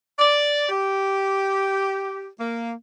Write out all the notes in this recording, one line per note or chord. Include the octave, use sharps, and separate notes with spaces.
D5
G4
A#3